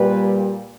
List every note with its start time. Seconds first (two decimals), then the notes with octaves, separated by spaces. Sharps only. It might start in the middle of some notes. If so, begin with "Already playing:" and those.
Already playing: A#2 G3 B4